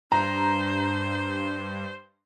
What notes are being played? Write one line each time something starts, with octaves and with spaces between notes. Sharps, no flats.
G2 D4 C5 A#5